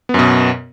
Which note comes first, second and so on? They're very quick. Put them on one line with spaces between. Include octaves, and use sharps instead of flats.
B3 F#2 B2